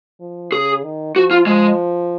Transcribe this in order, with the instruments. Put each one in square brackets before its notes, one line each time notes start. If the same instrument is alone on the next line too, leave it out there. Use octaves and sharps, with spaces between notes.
[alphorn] F3
[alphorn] C#3 [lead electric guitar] G#4
[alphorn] D#3
[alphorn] F3 [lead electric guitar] F#4
[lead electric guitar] F4
[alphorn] F3 [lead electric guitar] G#3